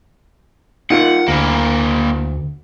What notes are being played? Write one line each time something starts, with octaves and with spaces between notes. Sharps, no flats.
D#4 F4 A#4 F#5
D2 A#3 E4